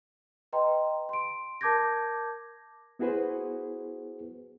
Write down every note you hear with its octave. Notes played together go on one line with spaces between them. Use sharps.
B4 D#5 G5 A#5 C6
C6 D7
A#4 A5 D6 G6 G#6 A#6
B3 E4 F#4 G#4 B4 C5